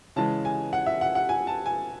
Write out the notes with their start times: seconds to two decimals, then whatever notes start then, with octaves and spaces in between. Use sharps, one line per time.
0.16 C#3 E3 G#3 A5
0.45 G#5
0.73 F#5
0.86 E5
1.01 F#5
1.15 F#5
1.29 G#5
1.47 A5
1.66 G#5